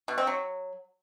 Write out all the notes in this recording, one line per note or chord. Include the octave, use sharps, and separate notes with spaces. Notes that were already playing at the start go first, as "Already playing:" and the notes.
B2
C4
F#3